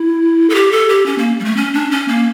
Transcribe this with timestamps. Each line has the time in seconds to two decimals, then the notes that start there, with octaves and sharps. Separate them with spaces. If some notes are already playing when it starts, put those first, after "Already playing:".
Already playing: E4
0.50 A4
0.55 G4
0.72 A4
0.89 G4
1.06 C#4
1.18 A#3
1.40 G3
1.45 A3
1.57 C#4
1.74 D4
1.91 C#4
2.08 A#3